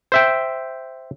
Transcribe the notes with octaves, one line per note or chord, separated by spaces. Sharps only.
C5 E5 G5